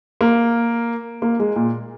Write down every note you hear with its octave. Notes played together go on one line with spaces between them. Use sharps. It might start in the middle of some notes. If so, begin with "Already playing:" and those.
A#3
A#3
G#3
A#2